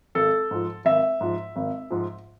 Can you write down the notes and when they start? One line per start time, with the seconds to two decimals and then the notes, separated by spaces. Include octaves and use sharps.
0.15 G#1 A4
0.51 G#2 F3
0.85 G#1 E5
1.21 G#2 F3
1.56 G#1
1.90 G#2 F3